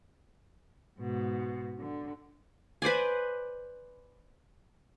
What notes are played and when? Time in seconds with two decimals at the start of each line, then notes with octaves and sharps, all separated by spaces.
0.99 G#2 B2
1.79 D3
2.82 B4 C5 D5 G#5